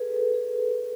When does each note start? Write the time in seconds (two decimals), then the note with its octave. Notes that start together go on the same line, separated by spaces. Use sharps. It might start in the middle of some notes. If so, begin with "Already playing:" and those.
Already playing: G#4 A4 B4
0.12 B4
0.16 A4
0.34 G#4